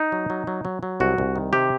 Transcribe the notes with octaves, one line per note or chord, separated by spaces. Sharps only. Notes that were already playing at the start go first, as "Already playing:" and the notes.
Already playing: D#4
F#3
F#3
F#3
F#3
F#3
C2 F#4
C2
D#3
C3 G4